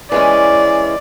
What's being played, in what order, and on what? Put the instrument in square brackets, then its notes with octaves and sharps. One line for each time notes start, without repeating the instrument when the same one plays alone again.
[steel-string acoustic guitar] E3 G#3 C#4 [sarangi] D5